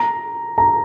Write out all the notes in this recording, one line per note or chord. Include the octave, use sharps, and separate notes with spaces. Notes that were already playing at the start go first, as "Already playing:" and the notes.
Already playing: A#5
A#5